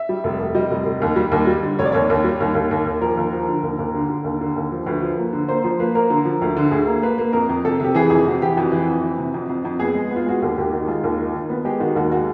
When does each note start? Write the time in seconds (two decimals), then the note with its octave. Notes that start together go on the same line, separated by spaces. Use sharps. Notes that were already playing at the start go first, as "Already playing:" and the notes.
Already playing: E5
0.09 G3
0.24 F1
0.40 F1
0.55 G3 D#5
0.71 F1
0.86 F1
1.02 D#2
1.16 G3
1.32 D#2
1.47 G3
1.63 D3
1.79 F1 C#5
1.85 D5
1.92 D#2 C#5
2.10 D#2
2.24 G3
2.40 D#2
2.55 D#2
2.71 D#2
2.86 D#2
3.01 F3 A#4
3.17 D#2
3.33 F3
3.48 D3
3.63 D#2
3.79 D#2
3.94 D3
4.09 D3
4.24 D#2
4.41 D3
4.56 D#2
4.72 F3
4.86 D2 B4
5.02 F3
5.18 A#3
5.33 D3
5.49 A#3 C5
5.64 F3 C5
5.80 A#3 B4
5.95 A#3 A#4
6.10 D3
6.25 F3
6.41 D2
6.57 D3
6.71 D2 G#4
6.87 A#3
7.02 A#3 B4
7.18 A#3
7.33 F2 A#4
7.49 F2
7.65 C3 A4
7.80 C3 G4
7.95 E3 G#4
8.10 F2 G#4
8.26 C3 F#4
8.42 E3 G4
8.57 F2 F#4
8.72 E3
8.88 F2
9.03 E3
9.18 C3
9.34 F2
9.49 F2
9.65 F2
9.80 B3 G#4
9.95 G#3
10.11 B3
10.16 F4
10.26 G#3 F#4
10.42 D#2 G4
10.58 D#2 G4
10.73 D#3 F#4
10.87 G#3 F4
11.04 D#2
11.19 D#3
11.34 D#3
11.50 B3
11.65 G#3 G4
11.80 D#3 F#4
11.96 D#2 F#4
12.11 G#3 F#4